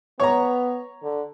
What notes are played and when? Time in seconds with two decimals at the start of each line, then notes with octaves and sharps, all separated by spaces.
0.20 B3 C#5 A#5
1.03 D3